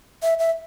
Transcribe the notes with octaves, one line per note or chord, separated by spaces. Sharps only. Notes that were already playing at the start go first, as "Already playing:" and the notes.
E5
E5